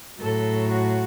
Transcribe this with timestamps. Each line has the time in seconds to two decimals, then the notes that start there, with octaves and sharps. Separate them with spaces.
0.19 A2 F#3 A4
0.71 F#4